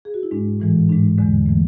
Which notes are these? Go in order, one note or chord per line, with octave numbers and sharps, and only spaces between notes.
G#4
F#4
E4
G#2 G#3 D4
A2 E3 G#3
G#2 G#3 D4
E2 D3 G#3
E3 A3